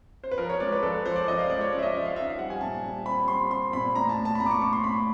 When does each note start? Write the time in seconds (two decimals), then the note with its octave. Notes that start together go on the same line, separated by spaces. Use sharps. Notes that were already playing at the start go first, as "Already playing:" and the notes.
0.24 C5
0.31 B4
0.38 F3 A#4
0.49 C#5
0.60 G#3 D5
0.72 B4
0.83 F3 A4
0.95 B4
1.05 F3 C5
1.16 D5
1.28 F3 D#5
1.39 F5
1.50 G#3 D5
1.61 C#5
1.72 C#4 D5
1.79 E5
1.83 D#5
1.94 F3 E5
2.06 F5
2.16 D#4 E5
2.28 F5
2.39 G3 F#5
2.50 G#5
2.61 A#2 A5
2.83 G3
3.06 C4 B5
3.28 G3 C6
3.50 C4 C6
3.72 A#2 B5
3.95 A2 A#5
4.09 A5
4.17 A2
4.25 A5
4.35 B5
4.40 A2 A#5
4.46 D6
4.51 C#6
4.62 A2 C#6
4.73 C6
4.84 A2 B5